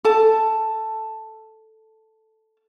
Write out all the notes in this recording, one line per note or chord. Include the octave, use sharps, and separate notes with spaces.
A4 A5